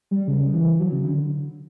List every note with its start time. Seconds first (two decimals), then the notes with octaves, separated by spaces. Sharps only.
0.11 G3
0.28 C#3
0.54 E3
0.79 F#3
0.92 C#3
1.05 D3